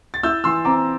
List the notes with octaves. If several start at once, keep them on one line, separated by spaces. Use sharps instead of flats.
A6
E4 E6 G6
E3 C6 E6
C4 A#5 D6